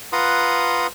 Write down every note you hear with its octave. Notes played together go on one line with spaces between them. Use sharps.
F4 B4 F#5 A#5 C6 D#6